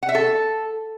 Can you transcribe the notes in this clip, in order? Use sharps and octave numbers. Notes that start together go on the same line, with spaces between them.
F#5
E5
A4